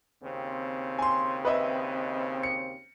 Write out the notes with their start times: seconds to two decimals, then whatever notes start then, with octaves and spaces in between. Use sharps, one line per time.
0.23 D#2 C#3 C4
0.99 G#5 C6
1.45 B4 D#5 E5
2.43 C#7